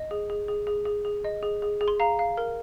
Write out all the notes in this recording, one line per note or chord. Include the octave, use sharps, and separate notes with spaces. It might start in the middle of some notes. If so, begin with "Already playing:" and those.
Already playing: D#5
G#4
G#4
G#4
G#4
G#4
G#4
D#5
G#4
G#4
G#4
C6
F5 A#5
F5
A#4